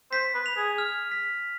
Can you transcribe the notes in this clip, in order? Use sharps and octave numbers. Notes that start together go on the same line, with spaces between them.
C5 B6
B4
F7
G#4
F6
B6